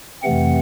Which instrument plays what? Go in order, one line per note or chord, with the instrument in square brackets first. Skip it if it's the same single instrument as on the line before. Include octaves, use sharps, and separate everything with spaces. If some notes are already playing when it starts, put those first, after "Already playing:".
[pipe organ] F2 C3 E3 A3 C4 F#5